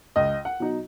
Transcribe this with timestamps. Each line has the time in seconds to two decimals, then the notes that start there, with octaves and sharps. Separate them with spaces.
0.16 C#2 D#5
0.45 F#5
0.60 B2 F#3 D#4